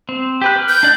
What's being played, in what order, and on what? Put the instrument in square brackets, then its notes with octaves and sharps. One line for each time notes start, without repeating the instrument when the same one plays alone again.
[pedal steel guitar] C4
G4 B4 F#6
B4 F6
[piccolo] G6
[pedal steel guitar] D4 D5 F#6